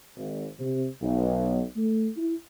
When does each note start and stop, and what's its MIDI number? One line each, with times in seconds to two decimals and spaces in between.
0.17 0.46 32
0.59 0.86 48
1.02 1.61 35
1.76 2.08 57
2.17 2.36 64